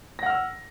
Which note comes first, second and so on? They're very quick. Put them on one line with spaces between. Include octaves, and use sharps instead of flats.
A#6 F#5 F6 E6